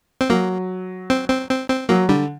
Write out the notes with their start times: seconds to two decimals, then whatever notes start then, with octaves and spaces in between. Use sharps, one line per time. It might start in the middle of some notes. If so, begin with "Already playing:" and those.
0.21 C4
0.30 F#3 A#3
1.10 C4
1.30 C4
1.50 C4
1.69 C4
1.89 F#3 A#3
2.09 D3 G3